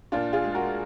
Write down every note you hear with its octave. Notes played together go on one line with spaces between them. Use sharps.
A#2 D4 F4
F4 G#4
G#3
F#4 A#4